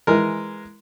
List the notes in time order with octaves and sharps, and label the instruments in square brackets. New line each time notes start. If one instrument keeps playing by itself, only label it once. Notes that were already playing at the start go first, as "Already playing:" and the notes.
[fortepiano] E3 G#3 A#4